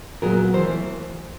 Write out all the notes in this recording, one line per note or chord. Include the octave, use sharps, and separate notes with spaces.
A#2 F#3 B3 G#4 A#4
E3 A3 A#4 C5